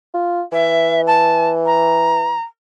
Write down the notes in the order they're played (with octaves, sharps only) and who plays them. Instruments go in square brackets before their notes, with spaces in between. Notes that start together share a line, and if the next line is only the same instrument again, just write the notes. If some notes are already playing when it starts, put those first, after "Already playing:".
[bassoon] F4
[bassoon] E3 [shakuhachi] E5
[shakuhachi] A5
A#5